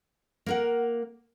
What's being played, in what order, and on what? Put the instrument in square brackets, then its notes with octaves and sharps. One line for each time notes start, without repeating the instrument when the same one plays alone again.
[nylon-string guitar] A#3 A#4 F#5